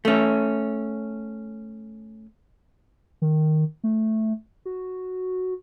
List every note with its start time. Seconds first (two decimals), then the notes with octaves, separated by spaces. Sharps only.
0.05 A3 C#4
3.22 D#3
3.84 A3
4.65 F#4